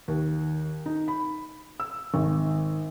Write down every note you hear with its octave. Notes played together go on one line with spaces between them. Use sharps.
D#2
D#4
B5
E6
G#1